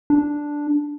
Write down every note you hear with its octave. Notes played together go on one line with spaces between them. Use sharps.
D4